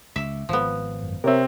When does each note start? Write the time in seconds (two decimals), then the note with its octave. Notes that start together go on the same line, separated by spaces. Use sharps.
0.16 C#2 E5
0.49 G#1 F3 B3
1.03 F#2
1.24 C3 C4 A#4 C#5 E5